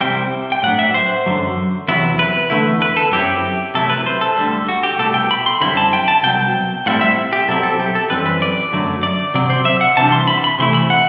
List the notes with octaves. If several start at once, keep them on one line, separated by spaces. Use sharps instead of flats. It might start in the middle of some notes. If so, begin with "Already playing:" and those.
C2 C3 G3 C4 E4 G5
G5
A2 F#3 B3 D4 F#5
E5
C5
F#2 D3 F#3
E2 C3 F#3 B3 E4
B4
E2 D3 A3 E4
B4
A4
F#2 F#3 C4 E4 G4
C3 F#3 A3 E4 A4
B4
C5
A4
D2 D3 G3
F#4
G4
C2 B2 A3 E4 A4
G5
B5
C6
F#2 D3 G3 C4 E4 B5
A5
G5
A5
C2 B2 F#3 G5
A2 G3 C4 E4 F#5
E5
G4
B2 F#3 C4 E4 A4
A4
G4
A4
F#2 E3 G3 C4 B4
B4
D5
F#2 D3 F#3 A3
D5
C3 F#3 C4 D5
C5
E5
F#5
C3 E3 G3 D4 A5
C6
B5
B5
C3 E3 A3 E4 C6
B5
F#5